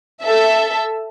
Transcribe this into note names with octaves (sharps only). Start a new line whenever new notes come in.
A4 E5